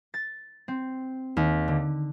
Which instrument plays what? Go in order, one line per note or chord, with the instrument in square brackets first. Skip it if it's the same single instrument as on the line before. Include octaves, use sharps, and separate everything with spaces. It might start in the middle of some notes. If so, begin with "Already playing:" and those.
[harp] A6
C4
D#2
D3